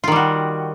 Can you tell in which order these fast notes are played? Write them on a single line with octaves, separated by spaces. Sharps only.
F4 D#3 G3 F#4